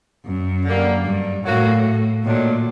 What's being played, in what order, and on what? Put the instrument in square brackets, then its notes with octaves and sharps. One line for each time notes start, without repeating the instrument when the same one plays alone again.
[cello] F#2
[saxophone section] D3 G3 A#3
[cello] G2
[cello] A2 [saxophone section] F#3 A#3 F#4
[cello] A#2 [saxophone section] D#3 F#3 A3 D4